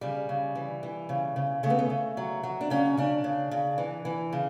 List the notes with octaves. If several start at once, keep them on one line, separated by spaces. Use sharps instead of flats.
C#3 G3
C#3
E3
E3
C#3
C#3
C#3 A3
B3
A3
C#3
F#3
F#3
D4
C#3 C#4
C#3 D4
C#3
C#3
E3
E3
C#3